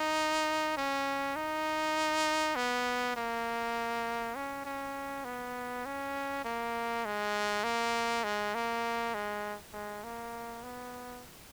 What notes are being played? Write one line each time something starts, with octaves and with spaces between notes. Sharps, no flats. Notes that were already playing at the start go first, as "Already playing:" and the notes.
Already playing: D#4
C#4
D#4
B3
A#3
C#4
C#4
B3
C#4
A#3
G#3
A#3
G#3
A#3
G#3
G#3
A#3
B3